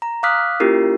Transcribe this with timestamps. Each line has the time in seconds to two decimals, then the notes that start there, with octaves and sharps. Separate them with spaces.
0.02 A#5
0.23 F5 D6 D#6 F6 F#6 B6
0.60 A#3 C#4 E4 F4 G4 A#4